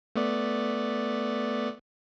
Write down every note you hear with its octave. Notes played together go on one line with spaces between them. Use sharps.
A3 B3 D5